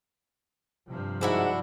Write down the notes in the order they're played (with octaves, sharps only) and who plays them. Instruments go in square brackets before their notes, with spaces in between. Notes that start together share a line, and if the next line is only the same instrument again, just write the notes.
[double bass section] G2 C3 F3
[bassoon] G#2 [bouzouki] D4 E4 F#4